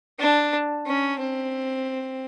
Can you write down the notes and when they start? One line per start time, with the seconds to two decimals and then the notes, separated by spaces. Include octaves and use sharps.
0.19 D4
0.86 C#4
1.20 C4